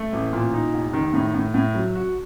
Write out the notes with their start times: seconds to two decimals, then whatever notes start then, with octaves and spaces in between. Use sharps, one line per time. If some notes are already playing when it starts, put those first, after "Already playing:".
Already playing: A3
0.13 A1
0.33 A#2
0.54 D#4
0.74 F1
0.93 D#3
1.13 A2
1.34 A2
1.54 A2
1.75 F#3
1.95 F#4